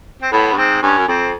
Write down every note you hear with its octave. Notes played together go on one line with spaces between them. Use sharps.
C4
A2 B3
G2
G#2 C4
G2 C#4
F#2
F2 C4